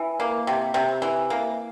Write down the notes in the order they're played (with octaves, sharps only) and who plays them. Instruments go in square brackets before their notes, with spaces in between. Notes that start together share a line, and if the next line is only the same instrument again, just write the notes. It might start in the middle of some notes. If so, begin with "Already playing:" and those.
Already playing: [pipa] E3
A#3
C3
C3
E3
A#3